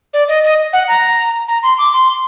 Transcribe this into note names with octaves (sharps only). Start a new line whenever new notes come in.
D5
D#5
D#5
F#5
A#5
A#5
C6
D6
C6